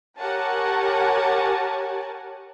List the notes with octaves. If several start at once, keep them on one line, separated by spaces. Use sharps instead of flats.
G4 A#4 C#5 F#5 G#5 A5